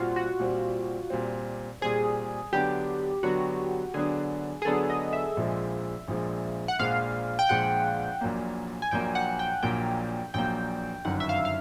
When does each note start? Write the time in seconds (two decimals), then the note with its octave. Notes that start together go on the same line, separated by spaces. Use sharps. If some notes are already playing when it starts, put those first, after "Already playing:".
Already playing: A#2 G3 C4 F4 F#4
0.16 F#4
0.40 A#2 G3 C4
1.10 A#2 G3 C4
1.81 A#2 G3 C4 G#4
2.53 D3 F#3 B3 D4 G4
3.23 D3 F#3 B3 D4 F#4
3.94 D3 F#3 B3 D4 G#4
4.62 G#4
4.65 D3 F#3 B3 D4 A4
4.90 D#5
5.13 E5
5.37 A#1 A#2 F3 G#3
6.08 A#1 A#2 F3 G#3
6.68 F#5
6.79 A#1 A#2 F3 G#3 F5
7.39 G5
7.49 A#1 A#2 F3 G#3 F#5
8.21 A#1 A#2 F#3 A#3
8.82 G#5
8.91 A#1 A#2 F#3 A#3 G5
9.15 F#5
9.39 G5
9.63 A#1 A#2 F#3 A#3 G5
10.34 A#1 A#2 F#3 A#3 G5
11.05 G1 F#2 D#3 F#5
11.20 E5
11.29 F5
11.45 F5